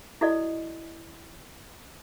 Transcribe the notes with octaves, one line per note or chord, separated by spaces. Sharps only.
E4 F#4 A4 D5 D#5